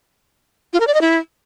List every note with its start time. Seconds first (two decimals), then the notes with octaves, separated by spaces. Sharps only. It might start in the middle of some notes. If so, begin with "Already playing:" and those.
0.73 F4
0.80 A#4
0.87 D5
0.94 D#5
1.01 E4